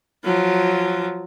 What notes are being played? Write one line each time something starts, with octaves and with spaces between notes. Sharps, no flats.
F3 F#3